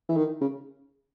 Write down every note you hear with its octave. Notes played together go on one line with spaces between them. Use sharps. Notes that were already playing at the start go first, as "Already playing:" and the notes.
E3
D#3
C#3